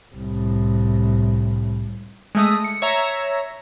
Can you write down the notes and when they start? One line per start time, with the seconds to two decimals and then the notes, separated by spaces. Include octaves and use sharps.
0.15 C2 A2
2.35 G#3 A3 D#6
2.64 C#7
2.82 C#5 E5 A#5